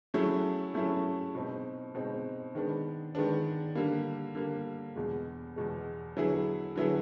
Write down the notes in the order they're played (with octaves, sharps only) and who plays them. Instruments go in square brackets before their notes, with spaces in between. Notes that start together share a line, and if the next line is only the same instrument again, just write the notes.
[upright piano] F#3 A3 C#4 E4 G#4
F#3 A3 C#4 E4 G#4
B2 G#3 C4 D#4
B2 G#3 C4 D#4
D#3 G#3 B3 D4
D#3 G#3 B3 D4
D3 G3 A#3
D3 G3 A#3
E2 B2 G#3
E2 B2 G#3
D3 F#3 B3 E4 G#4
D3 F#3 B3 E4 G#4